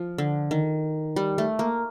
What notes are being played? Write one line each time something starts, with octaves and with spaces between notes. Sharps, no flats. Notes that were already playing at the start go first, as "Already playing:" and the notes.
Already playing: F3
D3
D#3
G3
A3
A#3